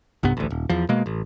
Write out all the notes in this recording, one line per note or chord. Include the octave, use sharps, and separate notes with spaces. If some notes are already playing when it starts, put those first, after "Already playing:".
B1 G2 C3 B3
A1 D2
D#1
E2 F3
B2 G#3 A#3
A1